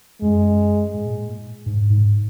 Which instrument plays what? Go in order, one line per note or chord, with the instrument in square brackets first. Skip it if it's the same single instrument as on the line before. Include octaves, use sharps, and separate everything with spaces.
[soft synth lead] F#2 [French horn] G#3
[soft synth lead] G#2
A#2
G#2
G#2
G#2